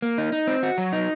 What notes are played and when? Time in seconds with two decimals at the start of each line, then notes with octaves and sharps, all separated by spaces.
0.02 A#3
0.18 D#4
0.32 D#4
0.47 C4
0.63 F#4
0.78 F#3
0.93 D#4